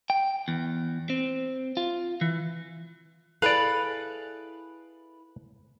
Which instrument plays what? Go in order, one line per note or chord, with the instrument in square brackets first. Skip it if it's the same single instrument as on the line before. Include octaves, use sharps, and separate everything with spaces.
[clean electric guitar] G5
E2
C4
F4
E3
[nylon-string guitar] E4 G#4 A4 [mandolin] B4 [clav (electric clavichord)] D5 F5